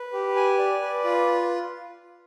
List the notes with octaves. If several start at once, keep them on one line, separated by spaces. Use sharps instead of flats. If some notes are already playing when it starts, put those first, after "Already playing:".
Already playing: B4
G4
G#5
D5
B4
F4